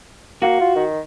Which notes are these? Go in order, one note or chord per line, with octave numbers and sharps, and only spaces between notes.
A#3 F#4
F4
D#3